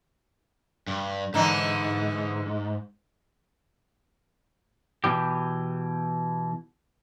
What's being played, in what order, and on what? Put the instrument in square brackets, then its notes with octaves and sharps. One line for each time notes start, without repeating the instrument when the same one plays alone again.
[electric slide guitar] G2
[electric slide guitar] G#2 [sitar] D3 E3 D#4
[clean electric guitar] B2 E3 G4